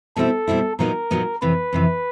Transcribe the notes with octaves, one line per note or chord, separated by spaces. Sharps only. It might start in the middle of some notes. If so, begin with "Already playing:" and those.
B2 G3 C4 E4 A4
B2 G3 C4 E4
A#2 F#3 B3 D#4 A#4
A#2 F#3 B3 D#4
F2 C3 E3 B4
F2 C3 E3